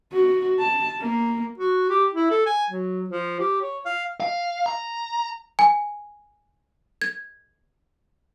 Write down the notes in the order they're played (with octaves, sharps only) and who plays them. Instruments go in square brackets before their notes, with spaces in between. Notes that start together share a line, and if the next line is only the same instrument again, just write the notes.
[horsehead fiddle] F#4
A5
A#3
[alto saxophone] F#4
G4
E4
A4
G#5
F#3
F3
G4
C#5
F5
[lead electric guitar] F5
A#5
[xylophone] G#5
G#6